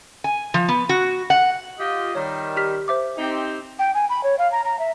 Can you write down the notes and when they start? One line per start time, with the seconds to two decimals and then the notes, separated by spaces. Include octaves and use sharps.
0.24 G#5
0.54 F3
0.68 B3
0.89 F#4
1.30 F#5
1.79 F4 G4 D#5
2.15 D#3 G3 C#5
2.57 G4 F6 B6
2.88 C5 E5 D6
3.18 C4 D#4 G4
3.79 G5
3.95 G#5
4.09 B5
4.24 C#5
4.39 F5
4.52 A#5
4.65 A#5
4.79 E5